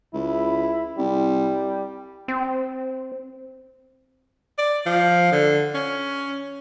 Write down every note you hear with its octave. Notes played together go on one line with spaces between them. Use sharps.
C#2 E4
C2 G3
C4
D5
F3
D3
C#4